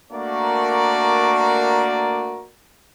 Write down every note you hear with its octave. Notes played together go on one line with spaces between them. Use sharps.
A3 A#3 D4 F#4 A#4 D5